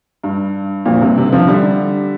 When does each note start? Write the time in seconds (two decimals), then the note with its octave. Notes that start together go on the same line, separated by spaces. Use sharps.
0.24 G2
0.86 F2 A#2
1.01 G2 C3
1.18 C3
1.25 D3
1.32 C3 F3
1.48 D3 G3